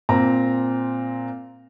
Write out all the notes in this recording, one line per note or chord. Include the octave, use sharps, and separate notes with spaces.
A#2 C4 A#5